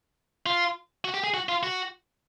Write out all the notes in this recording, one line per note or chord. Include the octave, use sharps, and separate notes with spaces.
F4
F#4
G4
G#4
F#4
F4
F#4